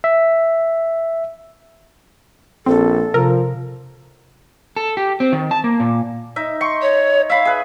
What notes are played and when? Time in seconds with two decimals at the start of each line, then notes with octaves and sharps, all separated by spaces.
0.04 E5
2.66 A#1 C4 A4
3.14 C3 F3 A#4
4.77 A4
4.97 G4
5.20 C4
5.33 D#3
5.51 A5
5.64 A#3
5.80 A#2
6.36 D#4 E5
6.61 C6 C#6
6.82 C#5
7.30 E5 F5 B5
7.45 G#4 B4